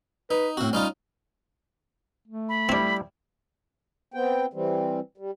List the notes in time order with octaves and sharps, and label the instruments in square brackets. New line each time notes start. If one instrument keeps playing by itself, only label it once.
[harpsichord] D#4 [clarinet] B4
[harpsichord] A2 F#4 [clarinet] C4
[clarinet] G3 [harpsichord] C#4 D#4 F4
[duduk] A3
[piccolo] B5
[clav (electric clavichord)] G3 E4 [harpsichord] C4 D4
[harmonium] B3 C4 G5
E3 G3 C4
G3